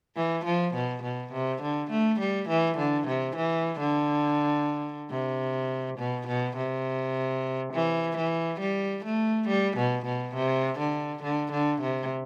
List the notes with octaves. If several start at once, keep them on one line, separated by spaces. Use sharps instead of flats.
E3
F3
B2
B2
C3
D3
A3
G3
E3
D3
C3
E3
D3
C3
B2
B2
C3
E3
E3
G3
A3
G3
B2
B2
C3
D3
D3
D3
C3